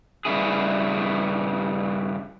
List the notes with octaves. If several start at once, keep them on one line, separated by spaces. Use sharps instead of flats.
G2 C#3 E3 E4 G#4